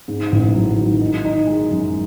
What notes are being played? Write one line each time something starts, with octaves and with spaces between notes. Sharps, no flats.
G#2
A1
F#3
D#3
D#4
D#4
G#3
F#2